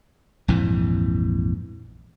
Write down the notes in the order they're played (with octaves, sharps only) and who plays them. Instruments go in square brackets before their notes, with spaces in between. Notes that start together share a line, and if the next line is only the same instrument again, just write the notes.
[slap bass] A#1 F2 G#2 E3